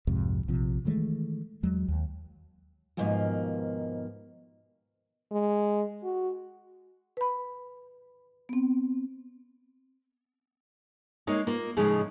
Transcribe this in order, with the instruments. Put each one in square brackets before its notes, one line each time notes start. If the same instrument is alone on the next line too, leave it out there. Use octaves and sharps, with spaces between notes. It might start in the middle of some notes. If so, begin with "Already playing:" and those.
[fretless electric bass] C2 F2 G#2 C3
A#1 C3 F3
D#3 E3 G#3 A3
E2 F#3 G#3
D#2
[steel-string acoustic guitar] D#2 G#2 B2 F3 A#3 G#5
[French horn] G#3
F#4
[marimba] B4 B5
B3 C4
[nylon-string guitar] G#3 A#3 D#4 C#5
A#3 F4
A2 C#3 F3 G#3 D#4 G#4